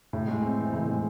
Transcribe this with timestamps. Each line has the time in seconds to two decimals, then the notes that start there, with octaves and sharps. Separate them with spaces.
0.13 A2
0.28 G#3
0.43 C4
0.58 E3
0.73 A2
0.88 G#3